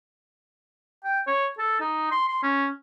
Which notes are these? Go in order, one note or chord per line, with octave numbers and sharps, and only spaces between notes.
G5
C#5
A4
D#4
C6
C6
C#4